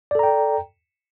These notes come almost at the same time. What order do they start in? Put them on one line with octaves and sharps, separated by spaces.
D5 A4 A#5 G5